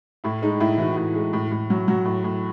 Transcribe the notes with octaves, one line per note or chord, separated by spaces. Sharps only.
A2 E4
G#3 D#4
A2 E4
E3 F#4
A2
G#3
A2
A2
F#3
F#3 F#4
A2
A2